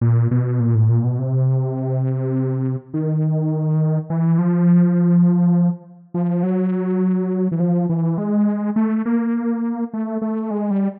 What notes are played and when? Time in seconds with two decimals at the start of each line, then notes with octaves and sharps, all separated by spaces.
0.01 A#2
0.31 B2
0.60 A#2
0.75 A2
0.90 A#2
1.04 B2
1.19 C3
2.94 D#3
4.10 E3
4.38 F3
6.14 F3
6.43 F#3
7.52 E3
7.60 F3
7.89 E3
8.18 G#3
8.76 A3
9.05 A#3
9.94 A3
10.22 A3
10.51 G#3
10.71 G3